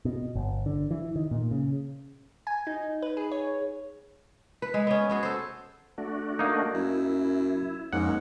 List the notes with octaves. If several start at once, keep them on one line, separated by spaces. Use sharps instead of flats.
B2
G1
D3
E3
D#3
A#2
C#3
G#5
D#4
B4
G#4
C#5
B4
G#3
B3 C#4
B3 F#4 G#4
A4 C5
A3 D4 F#4
A#3 D#4
F#2 E4
F2 G#2 A#3 C#4 F#5